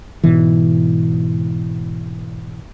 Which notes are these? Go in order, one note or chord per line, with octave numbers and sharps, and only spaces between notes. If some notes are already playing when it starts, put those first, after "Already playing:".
G#2 B2 E3